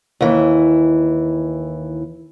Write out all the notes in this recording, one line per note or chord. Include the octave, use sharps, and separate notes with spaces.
D#2 E3